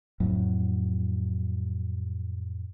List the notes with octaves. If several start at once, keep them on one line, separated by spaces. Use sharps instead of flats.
F2 A2 F#3